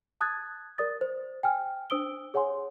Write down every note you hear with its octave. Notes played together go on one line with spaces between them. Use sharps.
A5 D#6 F#6 G#6 A6
A#4 D5 D#6 A6
C5
G5 G#5 F6
D4 C5 D#6 E6 D7 G7
G#4 C#5 F#5 G#5 C6